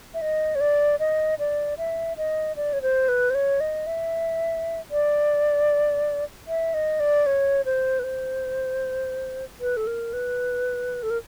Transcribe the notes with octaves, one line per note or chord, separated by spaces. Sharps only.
E5
D#5
C#5
D5
D#5
D5
E5
D#5
D5
C#5
C5
B4
C5
C#5
D#5
E5
D5
E5
D#5
D5
C#5
C5
B4
C5
B4
A4
A#4
B4
A4
A#4